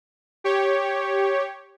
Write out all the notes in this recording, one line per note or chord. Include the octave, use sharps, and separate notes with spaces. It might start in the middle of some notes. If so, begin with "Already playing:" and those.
G4 C#5